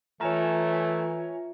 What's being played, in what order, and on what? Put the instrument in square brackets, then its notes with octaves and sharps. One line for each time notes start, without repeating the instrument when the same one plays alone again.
[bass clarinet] E3 [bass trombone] A3 [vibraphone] F4 E5 [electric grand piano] C#5 G#5 A#5